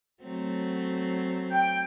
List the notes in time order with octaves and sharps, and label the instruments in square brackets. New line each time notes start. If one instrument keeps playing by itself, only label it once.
[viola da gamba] F#3 A3 C4
[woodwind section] G5